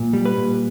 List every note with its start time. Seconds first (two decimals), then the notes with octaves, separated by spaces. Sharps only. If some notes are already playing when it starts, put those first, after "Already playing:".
Already playing: A#2
0.13 G3
0.25 B4
0.37 A#2